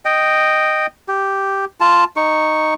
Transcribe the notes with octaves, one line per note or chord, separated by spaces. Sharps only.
D#5 G5
G4
F4 A5
D#4 C#6